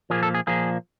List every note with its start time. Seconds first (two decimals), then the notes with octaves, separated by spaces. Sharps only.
0.10 A#2 F3 A#3 G#4
0.23 A4
0.34 G#4
0.47 A#2 F3 A#3 G#4